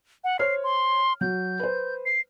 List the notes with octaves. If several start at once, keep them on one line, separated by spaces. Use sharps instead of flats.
F#5
C5 C#5 F6 C7
C6
F#3 G6
B4 C5
C7